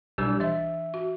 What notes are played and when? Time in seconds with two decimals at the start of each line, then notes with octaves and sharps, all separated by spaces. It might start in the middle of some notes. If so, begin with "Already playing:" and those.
0.18 B1 G3 D4 E6
0.40 E3 D#5 E5
0.94 F#4